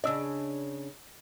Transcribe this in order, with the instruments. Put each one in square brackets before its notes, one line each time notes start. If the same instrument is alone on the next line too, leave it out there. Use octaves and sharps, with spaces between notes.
[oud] C#3 D4 [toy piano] D#5 E6